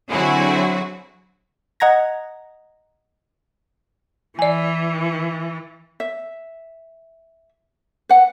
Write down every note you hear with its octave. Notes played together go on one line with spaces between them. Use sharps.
D3 F#3 C4 E4 F#4 G#4
D#5 F#5 A#5 G#6 A#6
E3 D5 G#5
E5
B4 F#5